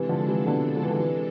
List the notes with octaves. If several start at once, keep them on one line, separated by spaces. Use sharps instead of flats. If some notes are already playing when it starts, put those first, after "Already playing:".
Already playing: C3 E3 G#3 D4 A4
D3 F3
C3 E3
B2 D3
F3
E3
D3
C3 E3